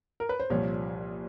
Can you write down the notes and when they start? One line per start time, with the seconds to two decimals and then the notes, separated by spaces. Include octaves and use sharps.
0.20 A#4
0.29 B4
0.40 C5
0.50 C2 A#2 F3 C#5